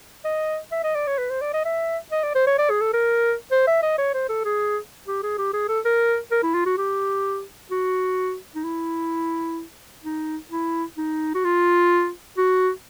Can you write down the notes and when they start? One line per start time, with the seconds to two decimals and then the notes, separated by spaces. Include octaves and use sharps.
0.25 D#5
0.72 E5
0.84 D#5
0.95 D5
1.07 C#5
1.18 B4
1.30 C5
1.41 D5
1.54 D#5
1.65 E5
2.12 D#5
2.23 D5
2.35 C5
2.47 C#5
2.58 D5
2.70 G#4
2.81 A4
2.93 A#4
3.51 C5
3.67 E5
3.82 D#5
3.98 C#5
4.14 C5
4.29 A4
4.45 G#4
5.07 G4
5.23 G#4
5.38 G4
5.53 G#4
5.69 A4
5.85 A#4
6.31 A#4
6.43 E4
6.54 F4
6.66 F#4
6.78 G4
7.71 F#4
8.55 D#4
8.64 E4
10.04 D#4
10.51 E4
10.97 D#4
11.34 F#4
11.44 F4
12.37 F#4